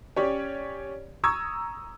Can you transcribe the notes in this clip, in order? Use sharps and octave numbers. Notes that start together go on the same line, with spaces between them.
C#4 G4 C#5 D5
A#5 C#6 D#6 E6 G#6